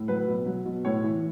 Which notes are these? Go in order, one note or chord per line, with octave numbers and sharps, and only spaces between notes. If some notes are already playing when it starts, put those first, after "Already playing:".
Already playing: A2
F#3 B4
B2
F#3
B2
A2 C#5
E3